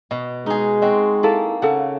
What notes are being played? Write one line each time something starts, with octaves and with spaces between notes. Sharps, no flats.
B2 D#5
G#3 D#4 G#4
C4 F#4 D#5
A#3 E4 A4
C#3 A4 F#5